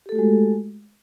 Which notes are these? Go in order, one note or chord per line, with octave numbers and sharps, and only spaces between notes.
G#3 A3 F#4 G4 A4